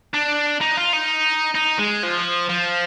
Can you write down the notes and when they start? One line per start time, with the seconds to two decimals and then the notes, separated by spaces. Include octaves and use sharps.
0.14 D4
0.61 D#4
0.77 F4
0.93 D#4
1.55 D#4
1.79 G#3
2.03 F3
2.50 F3